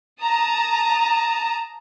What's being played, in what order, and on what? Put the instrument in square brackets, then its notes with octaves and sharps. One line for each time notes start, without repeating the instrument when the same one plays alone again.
[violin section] A5 A#5 D#6